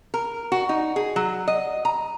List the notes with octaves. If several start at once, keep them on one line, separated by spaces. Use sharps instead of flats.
A#4
F#4
D#4
G#4
F#3
D#5
A#5